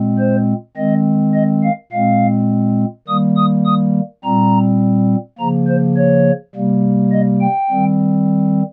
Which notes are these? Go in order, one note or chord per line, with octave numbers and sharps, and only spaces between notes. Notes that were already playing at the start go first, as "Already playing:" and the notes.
Already playing: A#2 G#3 C4
C5
D#3 G#3 C4 D#5
D#5
F5
A#2 G#3 C4 F5
D#3 G3 A#3 D#6
D#6
D#6
A#2 G3 C4 A#5
C#3 F3 A#3 A#5
C5
C#5
C3 G3 A#3
D#5
G5
D#3 G3 C4